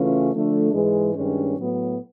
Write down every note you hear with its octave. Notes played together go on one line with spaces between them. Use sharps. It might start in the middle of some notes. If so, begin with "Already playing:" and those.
Already playing: C#3 E3 A3 C#4 F4
D3 F3 A3 D4
G#2 E3 G#3
G2 D#3 G#3 C#4
A2 F#3 B3